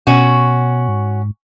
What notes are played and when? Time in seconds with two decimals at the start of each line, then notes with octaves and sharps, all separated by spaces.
0.07 B2 C#4 F#4
0.88 G#2